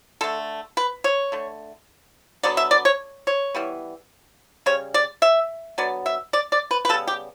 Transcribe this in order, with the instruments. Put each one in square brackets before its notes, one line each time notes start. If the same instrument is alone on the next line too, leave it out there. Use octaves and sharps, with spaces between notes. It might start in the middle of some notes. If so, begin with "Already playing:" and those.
[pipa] D3 A3 A4
B4
C#5
D3 A3
D3 F#3 B3 D5
E5
D5
C#5
C#5
E3 G3 B3
C#3 G3 C#5
D5
E5
D3 F#3 B3 D5
E5
D5
D5
B4
B4
C#3 G3 B3 A4
G4